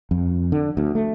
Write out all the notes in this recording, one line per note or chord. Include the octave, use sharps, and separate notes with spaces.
F2
D3
D2
A3